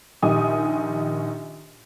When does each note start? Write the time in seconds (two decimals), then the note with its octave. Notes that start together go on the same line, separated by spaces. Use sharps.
0.22 A#1 D#3 D#4 G4 G#5 D#6